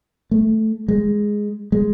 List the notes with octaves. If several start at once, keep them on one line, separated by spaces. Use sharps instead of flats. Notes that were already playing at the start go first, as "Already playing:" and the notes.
A3
G#3
G#3